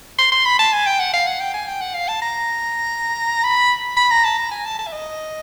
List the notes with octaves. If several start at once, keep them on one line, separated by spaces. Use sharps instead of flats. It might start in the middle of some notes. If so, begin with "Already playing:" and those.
C6
C6
B5
A5
G#5
G5
F#5
F5
F#5
G5
G#5
G5
F#5
F5
A5
A#5
B5
B5
A#5
A5
A#5
G#5
A5
A5
E5
D#5